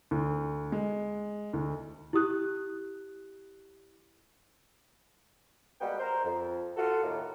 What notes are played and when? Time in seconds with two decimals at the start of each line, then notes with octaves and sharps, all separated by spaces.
0.11 D2
0.72 G#3
1.53 D2
2.13 E4 G4 D#6 F#6
5.81 G3 G#3 A#3 B3 F#4 G5
5.99 A#4 C5
6.24 F2
6.77 F4 F#4 A4
7.03 D#2 A2 A#3